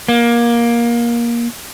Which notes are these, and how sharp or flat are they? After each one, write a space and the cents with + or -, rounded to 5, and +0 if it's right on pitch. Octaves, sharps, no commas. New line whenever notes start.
A#3 +20